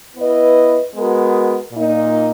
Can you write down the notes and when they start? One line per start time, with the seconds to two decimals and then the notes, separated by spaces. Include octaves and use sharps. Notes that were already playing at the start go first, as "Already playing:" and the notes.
0.15 B3 E4 B4 D#5
0.94 G#3 B3 F#4 A#4
1.73 A#2 A#3 D#4